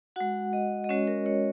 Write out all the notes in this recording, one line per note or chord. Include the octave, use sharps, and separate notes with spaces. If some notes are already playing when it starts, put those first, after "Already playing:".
G#3 F#4 F#5
D#5
D#5
G#3 C#4 F#4 C#5
A#4
C#5